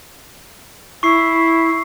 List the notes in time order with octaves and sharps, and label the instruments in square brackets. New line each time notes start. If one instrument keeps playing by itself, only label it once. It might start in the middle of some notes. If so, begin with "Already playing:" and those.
[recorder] E4 [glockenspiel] C#6 C7